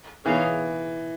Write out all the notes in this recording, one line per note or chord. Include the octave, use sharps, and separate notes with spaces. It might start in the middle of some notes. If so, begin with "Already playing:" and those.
E3 B3 D#4 G#4 C#5 F5